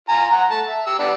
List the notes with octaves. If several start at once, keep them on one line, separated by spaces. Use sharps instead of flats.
F4 G#5 A#5
F#5 A#5
A3 A5
E5
G4 E6
G3 B3 D4